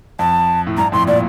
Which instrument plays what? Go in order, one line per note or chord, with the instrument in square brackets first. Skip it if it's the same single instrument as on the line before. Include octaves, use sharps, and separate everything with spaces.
[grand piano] F2 [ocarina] A5
[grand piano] A2
[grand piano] G2 [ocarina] A#5
[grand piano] F2 A2 [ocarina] C6
[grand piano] A#2 [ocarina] D5